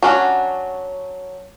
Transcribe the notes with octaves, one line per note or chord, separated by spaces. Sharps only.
F#3 C#4 D4 F#4